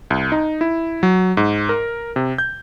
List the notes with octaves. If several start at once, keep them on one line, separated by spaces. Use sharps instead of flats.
C2
D#4
E4
F#3
G#2
A#4
C3
G6